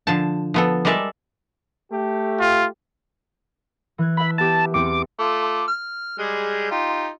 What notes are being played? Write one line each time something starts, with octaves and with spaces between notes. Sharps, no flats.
D3 F3 A5
F3 B3 A4
G3 G#3 A#4 D5 E5 A5
A3 G4
F4
E3 F#6 G#6
E5 A5 B5
B3 G4 A5
E2 C4 D6 C#7
A3 F4 D6
F6
G3 G#3 G#4
D#4 F4 G4